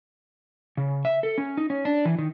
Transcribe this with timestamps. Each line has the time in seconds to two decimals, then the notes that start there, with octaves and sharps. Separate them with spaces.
0.77 C#3
1.05 E5
1.23 A4
1.38 C#4
1.57 D#4
1.70 C#4
1.85 D4
2.05 E3
2.19 D#3